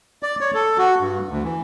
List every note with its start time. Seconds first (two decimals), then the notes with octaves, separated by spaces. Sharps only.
0.23 D5
0.41 C#5
0.54 A4
0.78 F#4
1.00 G2
1.29 D2
1.44 E3